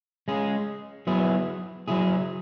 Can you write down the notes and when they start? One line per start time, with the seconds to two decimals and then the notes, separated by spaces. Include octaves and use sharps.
0.28 G#3 C#4 G#4
1.07 F#3 B3 E4 G#4
1.88 F#3 E4 G#4